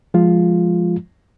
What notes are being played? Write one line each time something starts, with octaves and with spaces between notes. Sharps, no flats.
F3 G#3 F4